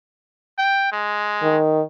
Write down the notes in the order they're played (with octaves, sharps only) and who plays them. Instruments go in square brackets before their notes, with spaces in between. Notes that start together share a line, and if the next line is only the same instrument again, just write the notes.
[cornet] G5
G#3
[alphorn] D#3